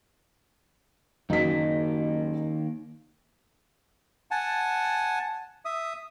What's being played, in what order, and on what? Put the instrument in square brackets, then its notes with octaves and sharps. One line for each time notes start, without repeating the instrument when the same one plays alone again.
[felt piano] F#1 B6 [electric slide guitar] D#3 A#3
[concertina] F#5 G#5 A5
E5 D#6